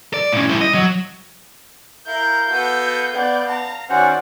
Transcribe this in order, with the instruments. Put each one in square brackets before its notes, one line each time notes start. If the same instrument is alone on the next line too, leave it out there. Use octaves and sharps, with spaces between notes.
[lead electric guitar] D5
A2 C#4
G3 E4
D#5
F#3
[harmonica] E4 A#4 [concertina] F5 [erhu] G6
[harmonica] B3 F#4 A4
[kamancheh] B3 D5
[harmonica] A5 [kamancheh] A#5
[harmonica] D#3 [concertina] C#4 C5 F#5 [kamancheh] F#4 D5